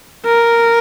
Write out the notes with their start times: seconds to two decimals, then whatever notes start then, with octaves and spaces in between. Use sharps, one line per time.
0.26 A#4